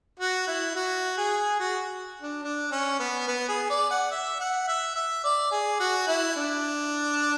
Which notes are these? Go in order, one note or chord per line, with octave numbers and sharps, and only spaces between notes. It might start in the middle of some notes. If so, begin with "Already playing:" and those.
F#4
E4
F#4
G#4
F#4
D4
D4
C#4
B3
B3
G#4
D5
F#5
E5
F#5
E5
E5
D5
G#4
F#4
E4
D4